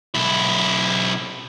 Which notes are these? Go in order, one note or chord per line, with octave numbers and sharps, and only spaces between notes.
B1 E4